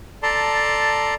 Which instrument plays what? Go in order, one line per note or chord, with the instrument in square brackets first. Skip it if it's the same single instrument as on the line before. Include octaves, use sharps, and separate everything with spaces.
[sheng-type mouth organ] A4 D5 A5 A#5 C6